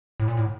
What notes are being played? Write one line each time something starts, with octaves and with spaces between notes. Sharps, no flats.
A2
A#2
A2